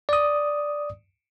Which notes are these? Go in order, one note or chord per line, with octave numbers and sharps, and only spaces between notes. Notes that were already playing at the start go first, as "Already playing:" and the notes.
D5 D#6